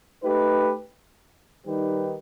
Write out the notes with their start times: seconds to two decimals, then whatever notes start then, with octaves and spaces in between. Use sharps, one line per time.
0.23 A3 D#4 G4 B4
1.66 D#3 G3 D#4 G4 B4